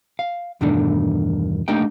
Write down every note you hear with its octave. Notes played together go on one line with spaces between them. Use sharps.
F5
E2 G2 B2 D#3 A3 D4
A3 A#3 D4 D#4 G4 G5